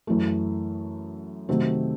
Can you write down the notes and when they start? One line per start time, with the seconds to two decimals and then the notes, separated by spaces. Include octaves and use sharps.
0.07 F#2 E3 A3
1.49 C3 D#3 F#3 A3 C4